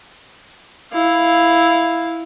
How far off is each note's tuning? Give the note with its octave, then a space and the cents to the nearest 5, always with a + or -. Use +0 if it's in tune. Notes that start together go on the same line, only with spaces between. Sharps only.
E4 +0 F5 +0